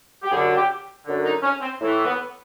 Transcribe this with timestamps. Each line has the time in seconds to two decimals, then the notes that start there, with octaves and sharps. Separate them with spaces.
0.23 G4
0.31 F#2 G#4
0.35 D3
0.56 G4
1.06 F#2 D3
1.24 D#4
1.43 C#4
1.61 C4
1.80 A2 E3
2.04 B3